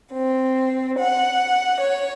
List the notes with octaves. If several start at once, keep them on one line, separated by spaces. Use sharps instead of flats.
C4
F#5
C#5